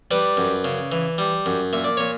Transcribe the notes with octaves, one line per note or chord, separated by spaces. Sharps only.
G3 B4 D5
F#2
C#3
E3
G3
F#2
A#2 E5
D5
A#2 C#5